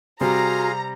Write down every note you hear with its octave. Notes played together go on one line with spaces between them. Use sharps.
C3 G3 C4 F#4 G#4 F5 A#5 C6